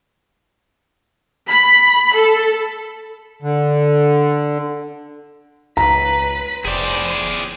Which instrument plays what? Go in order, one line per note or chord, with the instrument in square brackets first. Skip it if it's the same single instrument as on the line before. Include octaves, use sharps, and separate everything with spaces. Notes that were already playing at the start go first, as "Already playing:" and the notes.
[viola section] B5
A4
[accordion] D3
[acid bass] C#2 [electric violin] B4 B6 [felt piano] A#5
[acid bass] F1 [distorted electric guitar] G#4 D5 [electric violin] C5 G5